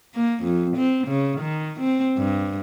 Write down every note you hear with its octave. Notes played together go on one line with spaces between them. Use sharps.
A#3
F2
C4
C#3
D#3
C4
G2